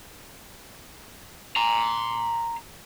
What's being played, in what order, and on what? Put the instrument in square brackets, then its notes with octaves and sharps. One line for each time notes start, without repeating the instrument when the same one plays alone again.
[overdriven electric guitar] A#5 C6